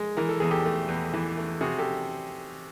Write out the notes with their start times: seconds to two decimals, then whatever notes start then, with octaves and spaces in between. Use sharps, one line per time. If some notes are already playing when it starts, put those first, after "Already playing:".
Already playing: G#3
0.17 E3 A#4
0.29 A4
0.40 E2 G#4
0.51 G4 A4
0.65 A3
0.89 E2
1.13 E3
1.37 A3
1.61 C3 F#4 G#4
1.78 G4 A4